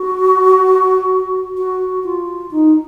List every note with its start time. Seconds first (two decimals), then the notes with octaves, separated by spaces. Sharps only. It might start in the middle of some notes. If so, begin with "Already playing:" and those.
Already playing: F#4
1.57 F#4
2.04 F4
2.51 D#4